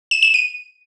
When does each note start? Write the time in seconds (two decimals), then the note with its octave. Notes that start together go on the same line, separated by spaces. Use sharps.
0.11 E7
0.23 E7
0.34 D#7